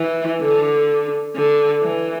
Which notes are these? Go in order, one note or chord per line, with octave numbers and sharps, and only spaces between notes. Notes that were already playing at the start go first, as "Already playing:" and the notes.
Already playing: E3
D3
D3
E3